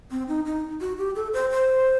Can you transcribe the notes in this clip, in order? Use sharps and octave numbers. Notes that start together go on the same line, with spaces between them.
C4
D#4
D#4
F#4
G4
A4
C5
C5